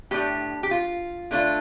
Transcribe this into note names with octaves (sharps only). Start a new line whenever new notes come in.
A2 A3 D4 G4
G4
F4
D3 A3 D4 F4